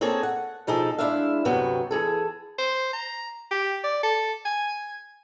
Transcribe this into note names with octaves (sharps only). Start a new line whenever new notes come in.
A#3 C4 G#4 A4 C#5
F#5
B2 F3 D#4 G#4 A4
G#3 A3 D4 E4 E5 F5
D2 G2 C3 F#3 B3 G5
E3 G#4 A4
C5
A#5
G4
D5
A4
G#5